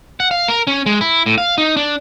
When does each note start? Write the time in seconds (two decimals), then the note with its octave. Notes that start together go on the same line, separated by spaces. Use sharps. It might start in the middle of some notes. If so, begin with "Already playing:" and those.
0.20 F#5
0.31 F5
0.48 A#4
0.67 C#4
0.86 G#3
1.01 E4
1.26 A2
1.38 F5
1.58 D#4
1.77 D4